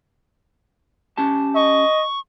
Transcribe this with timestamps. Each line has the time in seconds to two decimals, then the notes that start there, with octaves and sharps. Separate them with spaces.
1.18 C#4 G4 A5
1.55 D#5 C#6